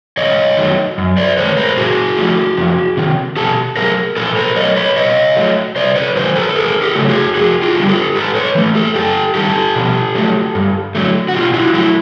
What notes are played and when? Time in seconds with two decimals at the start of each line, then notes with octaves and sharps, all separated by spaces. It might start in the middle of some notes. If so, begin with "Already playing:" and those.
0.17 G#2 C#5 D#5
0.57 D#3 F#3 A3
0.98 F#2
1.17 C5 D5
1.37 D#3 G#3 B4 C#5
1.57 A#4 C5
1.77 A#2 F#4 G#4
2.18 F3 A3
2.57 F2
2.97 C3 D#3
3.37 B2 G4 A4
3.77 F#3 A3 G#4 A#4
4.17 A#2 A4 B4
4.37 A#4 C5
4.56 F#3 A3 C#5 D#5
4.76 B4 C#5
4.96 B2 C#5 D#5
5.36 F#3 A3
5.76 C3 C5 D5
5.96 B4 C#5
6.16 D#3 F#3 A#4 C5
6.36 A4 B4
6.49 A4
6.56 E2 G#4 A#4
6.82 G4 A4
6.96 C#3 F#3 A3
7.09 F#4 G#4
7.35 F2 F#4 G#4
7.62 F4 G4
7.75 D3 G3
7.89 G4 A4
8.16 G#2 A4 B4
8.35 B4 C#5
8.55 E3 A3
8.75 G4 A4
8.95 F#2 G4 A4
9.35 D#3 G3 G4 A4
9.75 B2
10.15 F#3 A3
10.55 G2
10.95 D3 F#3 A3
11.28 F#4
11.34 B2 F4 G4
11.54 E4 F#4
11.74 F#3 A3 E4 F#4